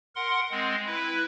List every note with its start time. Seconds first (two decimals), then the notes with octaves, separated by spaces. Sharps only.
0.16 A#4 F#5 C6
0.51 G#3 C4
0.87 E4 B4